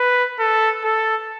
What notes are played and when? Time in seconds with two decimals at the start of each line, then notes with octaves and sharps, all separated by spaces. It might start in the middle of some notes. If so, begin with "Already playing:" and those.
Already playing: B4
0.39 A4
0.84 A4